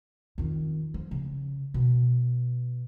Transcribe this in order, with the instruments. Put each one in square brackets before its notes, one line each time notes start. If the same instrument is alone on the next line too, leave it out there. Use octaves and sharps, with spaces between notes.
[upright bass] F2 D#3
F3
C#3
B2